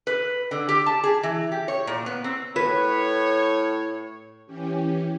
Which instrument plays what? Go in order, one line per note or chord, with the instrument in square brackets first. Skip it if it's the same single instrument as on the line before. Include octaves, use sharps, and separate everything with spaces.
[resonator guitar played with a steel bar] B4
D3
G4
A5
G#4
E3
G4
C#5
A#2
B3
C4
[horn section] A2 C#5 [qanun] B4
[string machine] E3 C#4 G4